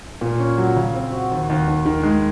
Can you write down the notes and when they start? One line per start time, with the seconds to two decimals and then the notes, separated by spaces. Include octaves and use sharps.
0.21 A#2
0.39 C#4
0.58 F#3
0.76 C#3
0.94 C4
1.13 F#4
1.32 D#2
1.50 D#2
1.68 D#2
1.86 D#3
2.03 G#3